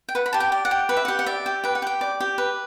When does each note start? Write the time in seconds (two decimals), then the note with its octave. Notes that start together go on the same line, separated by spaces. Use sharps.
0.09 G5
0.15 B4 F#5
0.26 B5
0.33 G4 A5
0.40 G5
0.52 D5
0.65 F#5
0.71 G4
0.89 B4 F#5
0.97 E5
1.05 G4 F#5
1.19 F#5
1.26 D5 E5
1.46 G4
1.64 B4 G5
1.75 F#5
1.82 G4 G5
2.01 D5
2.20 G4
2.38 B4